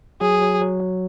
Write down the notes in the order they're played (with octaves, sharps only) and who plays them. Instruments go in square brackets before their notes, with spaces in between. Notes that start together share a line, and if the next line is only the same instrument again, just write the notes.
[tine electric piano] F#3 [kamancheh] G#4
[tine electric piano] F#3
F#3
F#3